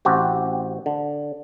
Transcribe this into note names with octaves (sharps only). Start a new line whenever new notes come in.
A1 C4 F#4 G4
D3